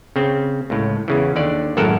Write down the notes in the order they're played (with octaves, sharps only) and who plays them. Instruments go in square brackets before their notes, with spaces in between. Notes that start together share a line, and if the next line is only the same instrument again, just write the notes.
[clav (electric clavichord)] C#3 C4
C#2 A2
E2 C#3 E3
D#2 D3 D5
G#1 F#2 A2 A4 A#4 F#5